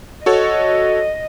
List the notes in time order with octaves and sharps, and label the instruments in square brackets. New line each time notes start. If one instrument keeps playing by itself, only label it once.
[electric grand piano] F#4 A4 C#5 [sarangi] D#5